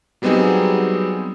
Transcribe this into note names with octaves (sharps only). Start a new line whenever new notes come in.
F#3 G3 B3 C4 D#4 G#4